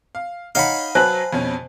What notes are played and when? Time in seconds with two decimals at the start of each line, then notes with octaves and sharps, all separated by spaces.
0.15 F5
0.55 D#4 C#5 F5 F#5 B5
0.95 F#3 B4 C5 G#5 A5 F#7
1.33 F2 B2 C#4